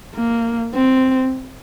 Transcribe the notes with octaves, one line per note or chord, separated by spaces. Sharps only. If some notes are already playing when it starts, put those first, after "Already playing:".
A#3
C4